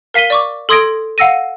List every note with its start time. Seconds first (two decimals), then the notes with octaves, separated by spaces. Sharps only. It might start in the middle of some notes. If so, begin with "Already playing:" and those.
0.14 A#4 F5 B6 D#7 G7
0.30 D5 C#6 D6
0.69 A4 C6 D#6 G#6 A#6 D7
1.18 F5 F#5 E6 A#6 D#7